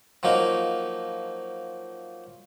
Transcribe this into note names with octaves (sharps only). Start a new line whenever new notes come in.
F3 F#3 A#3 D#4